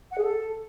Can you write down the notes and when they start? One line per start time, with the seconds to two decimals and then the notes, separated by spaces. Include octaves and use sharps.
0.12 F#5
0.18 G#4
0.23 A4